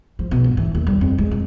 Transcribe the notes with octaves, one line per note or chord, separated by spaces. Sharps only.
F3
B2
G1
E3
D#2
G3
F2
G#3
F2